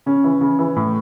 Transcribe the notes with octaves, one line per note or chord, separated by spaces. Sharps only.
C#3 C#4
E3
C#3
E3
A2